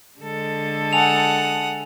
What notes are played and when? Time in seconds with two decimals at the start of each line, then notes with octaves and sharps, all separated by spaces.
0.20 D3 G#3 A4
0.93 F#5 G#5 A5 D#6 F7